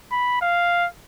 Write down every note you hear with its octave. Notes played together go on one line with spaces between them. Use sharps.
B5
F5